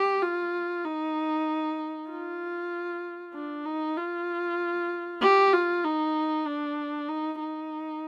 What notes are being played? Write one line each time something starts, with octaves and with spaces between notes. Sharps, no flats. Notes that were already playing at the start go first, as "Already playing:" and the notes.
Already playing: G4
F4
D#4
F4
D4
D#4
F4
G4
F4
D#4
D4
D#4
D#4